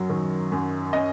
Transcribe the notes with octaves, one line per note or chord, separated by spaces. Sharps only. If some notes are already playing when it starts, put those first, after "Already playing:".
Already playing: F#2 F#3
D#3
F#2
C#4 D#5